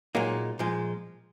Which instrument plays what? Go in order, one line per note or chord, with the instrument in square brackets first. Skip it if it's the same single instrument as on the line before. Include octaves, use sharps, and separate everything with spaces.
[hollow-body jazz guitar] A#2 G#3 D#4 [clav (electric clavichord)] F#3 A#3
[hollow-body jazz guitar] A#2 F3 G#3